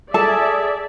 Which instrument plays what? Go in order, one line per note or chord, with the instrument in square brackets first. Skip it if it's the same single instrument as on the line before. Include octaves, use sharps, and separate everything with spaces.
[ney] G#4 [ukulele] A4 A5 [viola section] D5 E5